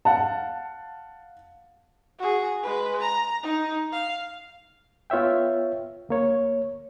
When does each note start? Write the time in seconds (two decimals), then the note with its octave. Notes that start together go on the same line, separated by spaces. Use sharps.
0.05 F5 F#5 A5
2.19 F#4 G#4
2.63 G#3 B4
3.00 A#5
3.43 D#4
3.92 F5
5.10 B3 F4 C#5 E5 G5
6.09 D2 A#3 C#5